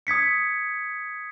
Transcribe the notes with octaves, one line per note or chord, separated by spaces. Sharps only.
D#6 G#6 B6 C#7